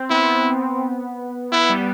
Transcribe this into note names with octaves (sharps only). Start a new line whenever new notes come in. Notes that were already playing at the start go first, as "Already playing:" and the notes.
Already playing: C4
B3 E4
B3 E4
G3